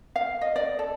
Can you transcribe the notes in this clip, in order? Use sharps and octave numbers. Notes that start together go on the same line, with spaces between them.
F5
D#5
D5
A4